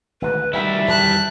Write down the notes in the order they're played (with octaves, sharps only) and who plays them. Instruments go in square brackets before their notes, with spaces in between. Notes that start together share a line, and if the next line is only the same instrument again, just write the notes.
[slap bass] G#1 D2 G#2 [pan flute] B4
[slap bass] D2 D#3 [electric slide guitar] G3 E4 [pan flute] E5
[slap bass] E2 D#3 F#3 [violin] A5 F#6